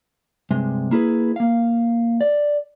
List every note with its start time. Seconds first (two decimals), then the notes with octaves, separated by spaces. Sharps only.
0.51 G2 C3 G#3
0.91 A#3 E4 G#4 B4
1.36 A#3 F5
2.21 D5